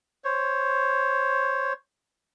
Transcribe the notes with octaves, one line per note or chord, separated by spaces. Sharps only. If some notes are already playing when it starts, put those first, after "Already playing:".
C5 C#5